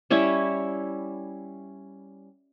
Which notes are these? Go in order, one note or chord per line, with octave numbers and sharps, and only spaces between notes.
G3 C#4 E4 C#5